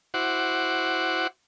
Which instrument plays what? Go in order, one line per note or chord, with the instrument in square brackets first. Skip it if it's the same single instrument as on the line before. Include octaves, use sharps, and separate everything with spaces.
[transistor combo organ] E4 F#4 C5 F#5 D6